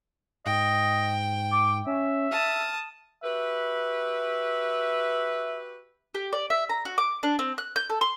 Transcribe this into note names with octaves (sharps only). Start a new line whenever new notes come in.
G#2 D#5 G5
D6
C#4 E5
A5 D#6 F6
F#4 G4 B4 E5
G4
D5
E5
A#5
F#4
D6
D4
C4
F#6
G6
A4
C6